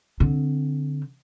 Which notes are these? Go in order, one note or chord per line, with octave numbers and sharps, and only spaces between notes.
D3 C4